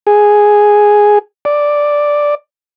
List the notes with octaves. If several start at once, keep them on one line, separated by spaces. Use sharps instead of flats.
G#4
D5